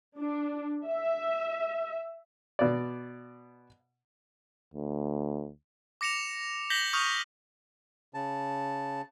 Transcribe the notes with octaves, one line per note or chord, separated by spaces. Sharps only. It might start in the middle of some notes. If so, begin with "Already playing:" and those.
D4
E5
B2 D5
D2
D6 A#6 C#7 E7 F7
G6 A#6 B6 F#7 G7
C#6 D#6 F6 G6 F7
C#3 A5